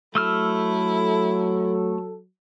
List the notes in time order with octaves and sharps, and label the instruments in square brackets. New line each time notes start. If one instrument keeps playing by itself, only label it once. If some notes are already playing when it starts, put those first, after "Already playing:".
[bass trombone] F#3 [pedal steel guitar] A3 E6 F6 [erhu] E4 [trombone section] A4